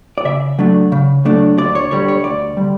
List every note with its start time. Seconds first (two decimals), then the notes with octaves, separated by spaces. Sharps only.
0.18 D5
0.25 C#3 E5
0.59 F#3 A3 D4
0.92 C#3
1.25 F#3 A3 D4
1.58 D2 D5
1.75 C#5
1.91 D3 G3 C#5
2.08 C#5
2.24 D2 D5
2.57 D3 G3